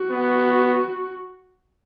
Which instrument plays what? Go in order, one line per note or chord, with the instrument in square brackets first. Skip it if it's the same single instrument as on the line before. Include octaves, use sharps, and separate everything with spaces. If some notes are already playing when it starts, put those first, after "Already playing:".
Already playing: [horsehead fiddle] F#4
[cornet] B3